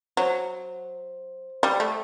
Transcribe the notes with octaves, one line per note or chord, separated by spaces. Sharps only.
F#3 C5
G3
A3